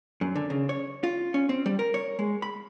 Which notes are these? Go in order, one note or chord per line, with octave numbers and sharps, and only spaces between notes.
F#2
D3
C#3
C#5
F4
C#4
C4
G3
A#4
C#5
G#3
B5